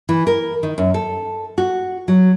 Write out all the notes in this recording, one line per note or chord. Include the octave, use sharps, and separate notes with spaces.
E3
A#4
D#3
F#2
A4
F#4
F#3